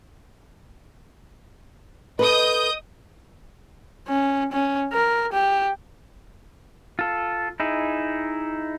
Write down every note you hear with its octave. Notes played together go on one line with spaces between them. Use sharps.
A4 B4 D#5 D#6 G6
C#4
C#4
A#4
G4
F4 A4
D#4 E4 G#4